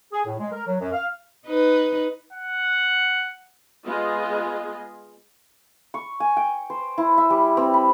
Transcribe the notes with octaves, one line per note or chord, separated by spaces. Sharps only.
G#4
A2
G#3
A#4
F#3
F#2
F5
D#4 B4
F#5
G#3 B3 F4 G#4 D#5
C#6
G#5
G5
C5
E4
E5
G3
C4
B5